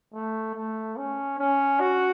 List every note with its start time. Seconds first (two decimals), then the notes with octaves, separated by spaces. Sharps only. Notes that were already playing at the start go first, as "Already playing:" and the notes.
0.14 A3
0.55 A3
0.97 C#4
1.39 C#4
1.80 F#4